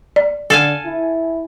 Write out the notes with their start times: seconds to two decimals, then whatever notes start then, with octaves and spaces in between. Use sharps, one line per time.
0.16 D5
0.50 D3 A4 F5 G#5
0.85 E4